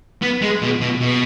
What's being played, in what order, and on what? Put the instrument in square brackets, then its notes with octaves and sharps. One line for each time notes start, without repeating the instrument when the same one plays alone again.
[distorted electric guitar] B3
G#3
B2
B2
B2